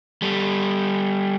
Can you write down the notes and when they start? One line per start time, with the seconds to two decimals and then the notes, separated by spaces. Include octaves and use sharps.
0.22 G3 A4